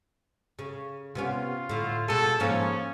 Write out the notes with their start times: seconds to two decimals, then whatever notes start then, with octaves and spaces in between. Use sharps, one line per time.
0.59 C#3
1.15 C3 B3 C#4 F4
1.69 A2 D3
2.08 B2 G#4 A4
2.40 G#2 F3 A#3 C#4